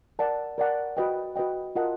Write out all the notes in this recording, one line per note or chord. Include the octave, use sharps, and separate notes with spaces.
A#4 D5 F#5 A5
A#4 D5 F#5 A5
F#4 B4 D#5 G5
F#4 B4 D#5 G5
F4 A#4 D#5 F#5 A5